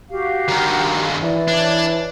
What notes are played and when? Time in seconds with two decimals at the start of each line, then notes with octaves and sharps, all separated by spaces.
0.10 F#4 G4 F5
0.48 G2 D#3
1.22 E3 D5
1.48 D4 C#5